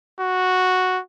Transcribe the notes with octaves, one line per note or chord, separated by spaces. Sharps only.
F#4